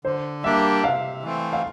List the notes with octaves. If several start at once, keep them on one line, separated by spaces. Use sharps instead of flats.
D3 C5
G3 A#3 D4 G4 E5
C3 F5
E3 A3 C4
F5